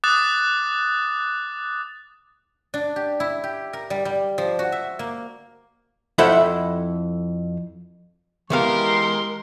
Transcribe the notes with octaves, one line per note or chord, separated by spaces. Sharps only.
D6 D#6 F#6 A6
D4
G4
E4
G4
A#4
G3
G3
F3
F#4
E5
A#3
F2 E4 A4 C5 E5 F#5
E3 G#3 B3 G4 A#4 F5 C6